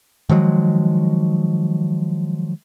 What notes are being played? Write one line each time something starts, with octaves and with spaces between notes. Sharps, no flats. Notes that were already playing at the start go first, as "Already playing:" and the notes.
D#3 F3 F#3 G#3